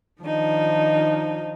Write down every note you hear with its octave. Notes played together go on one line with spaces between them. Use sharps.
D#3 F3 D4 D#4